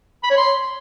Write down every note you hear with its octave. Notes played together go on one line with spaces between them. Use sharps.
B5
C#5
C6